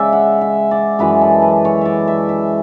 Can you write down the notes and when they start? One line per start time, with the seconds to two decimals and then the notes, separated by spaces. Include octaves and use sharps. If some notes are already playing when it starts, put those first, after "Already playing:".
Already playing: C#3 G#3 D5 E5
0.13 F#5
0.41 E5
0.71 D5
0.99 F#2 E3 G#3 B4
1.22 A4
1.42 B4
1.65 C#5
1.81 D5 E5
2.08 E5
2.29 E5